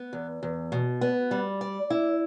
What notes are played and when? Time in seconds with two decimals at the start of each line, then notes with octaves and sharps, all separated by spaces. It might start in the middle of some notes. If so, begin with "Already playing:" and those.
Already playing: B3
0.13 E2
0.43 E2
0.72 B2
1.01 B3
1.31 G3
1.61 D5
1.90 E4